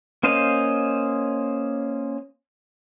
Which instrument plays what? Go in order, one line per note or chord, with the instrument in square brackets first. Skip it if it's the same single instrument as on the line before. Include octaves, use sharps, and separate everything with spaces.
[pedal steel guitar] A#3 C#4 C5 D#5 F5